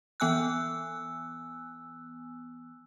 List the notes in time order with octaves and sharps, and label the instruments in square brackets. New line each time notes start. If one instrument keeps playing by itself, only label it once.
[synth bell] E3 B3 G#5 E6 F#6